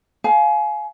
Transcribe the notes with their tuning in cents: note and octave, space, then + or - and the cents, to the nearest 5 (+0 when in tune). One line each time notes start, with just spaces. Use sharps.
F5 +0 G#5 +30